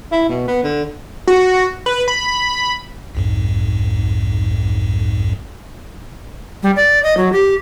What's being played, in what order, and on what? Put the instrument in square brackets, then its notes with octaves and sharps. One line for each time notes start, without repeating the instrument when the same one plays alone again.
[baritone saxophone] E4
B2
B3
D3
[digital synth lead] F#4
B4
B5
[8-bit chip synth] B1 F2 G#2
[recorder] G3
D5
D#5
F#3
G4